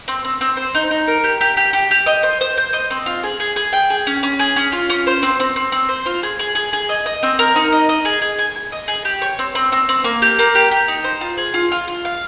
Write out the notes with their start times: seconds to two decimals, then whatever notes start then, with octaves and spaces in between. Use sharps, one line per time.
0.08 C4
0.24 C4
0.41 C4
0.57 C5
0.75 D#4
0.91 D#4
1.07 A#4
1.24 G4
1.41 G4
1.57 G4
1.73 G4
1.91 G4
2.06 D#5
2.23 C5
2.41 C5
2.57 C5
2.73 D#5
2.90 C4
3.06 F4
3.23 G#4
3.40 G#4
3.56 G#4
3.73 G5
3.90 G#4
4.07 C#4
4.23 C#4
4.39 G#4
4.56 C#4
4.72 F4
4.90 C#4
5.07 C5
5.23 C4
5.40 C4
5.56 C4
5.72 C4
5.89 C5
6.06 F4
6.23 G#4
6.39 G#4
6.55 G#4
6.73 G#4
6.89 D#5
7.06 D#5
7.23 C4
7.39 A#4
7.56 D#4
7.72 D#5
7.89 D#5
8.05 G#4
8.22 G#4
8.39 G#5
8.56 G#5
8.72 D#5
8.88 G#4
9.05 G4
9.22 C#5
9.39 C4
9.55 C4
9.72 C4
9.89 C4
10.04 A#3
10.22 G4
10.39 A#3
10.55 G4
10.71 G4
10.88 D#4
11.04 C5
11.21 F4
11.38 G#4
11.54 F4
11.72 F4
11.88 F4
12.05 F5